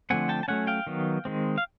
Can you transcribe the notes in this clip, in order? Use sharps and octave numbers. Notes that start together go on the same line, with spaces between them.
D3 F3 A3 C4 F#5 G#5
G5 A5
A5
F#3 A3 C#4 F#5 G#5
F5 G5
D#3 F#3 B3
D#3 G#3 C4
F5